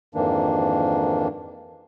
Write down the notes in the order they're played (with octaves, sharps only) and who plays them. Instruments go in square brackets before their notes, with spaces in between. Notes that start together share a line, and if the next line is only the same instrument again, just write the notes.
[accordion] F2 G#2 D#3 E3 A#3 D4